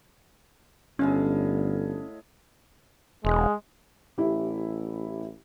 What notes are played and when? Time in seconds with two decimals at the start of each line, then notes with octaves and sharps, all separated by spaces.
0.99 G1 A2 G#3 C#4 F5
3.25 E1 G#3
4.18 A1 E4 G4